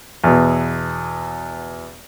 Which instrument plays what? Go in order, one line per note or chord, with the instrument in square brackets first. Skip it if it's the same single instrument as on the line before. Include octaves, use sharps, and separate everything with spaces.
[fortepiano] E2 B2